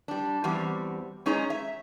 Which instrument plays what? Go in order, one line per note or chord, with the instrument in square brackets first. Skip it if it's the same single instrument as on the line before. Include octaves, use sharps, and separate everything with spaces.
[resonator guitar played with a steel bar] G3 D4
E2 G3 C4 F#4
G#3 C#4 D#4 G#4 C#5 A#5
E5